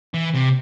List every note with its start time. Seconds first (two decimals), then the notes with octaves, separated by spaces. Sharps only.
0.14 E3
0.34 C3